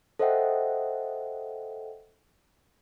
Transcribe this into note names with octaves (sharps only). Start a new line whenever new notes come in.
A4 C5 D#5 E5 F#5 G5